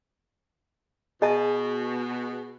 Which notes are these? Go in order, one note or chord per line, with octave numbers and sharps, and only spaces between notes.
B2 G#4 D#5 A5